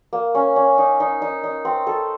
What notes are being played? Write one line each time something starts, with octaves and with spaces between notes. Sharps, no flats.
A#3
C#4
C#4
D#4
D#4
D#4
D#4
C4
A4